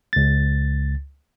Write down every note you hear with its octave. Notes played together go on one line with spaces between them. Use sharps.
C#2 A6